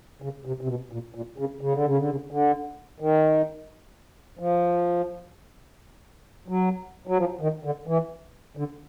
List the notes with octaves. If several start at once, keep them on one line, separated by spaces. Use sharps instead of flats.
C#3
C3
C3
B2
A#2
A#2
C#3
C#3
D3
C#3
D3
C#3
D3
D#3
F3
F#3
F#3
F3
D#3
D3
E3
D3